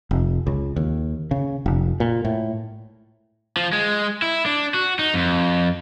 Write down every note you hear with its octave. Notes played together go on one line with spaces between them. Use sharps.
F1
C#2
D#2
C#3
F1
A#2
A2
F3
G#3
E4
D4
F#4
D#4
F2